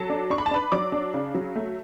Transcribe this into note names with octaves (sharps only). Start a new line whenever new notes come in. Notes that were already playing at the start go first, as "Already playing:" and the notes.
Already playing: F#3 A4 A5
D4
D4 C#6
B5
A5
D4 B4 B5
F#3 D5 D6
D4
C#3
F#3
A3